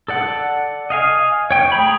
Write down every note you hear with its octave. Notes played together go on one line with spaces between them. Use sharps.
A4 D5 F#5
D#5 F5 G#5
C#5 G5
A3 G#4 A#5 B5